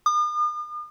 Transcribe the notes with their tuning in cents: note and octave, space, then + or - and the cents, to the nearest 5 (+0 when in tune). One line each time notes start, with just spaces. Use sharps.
D#6 -45